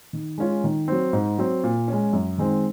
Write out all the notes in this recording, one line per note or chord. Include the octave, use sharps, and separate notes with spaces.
D#3
G#3 C#4 F4
D#3
F#3 C4
G#2
F#3 C4
A#2
G#3 C#4
F#2
D#3 G#3 C4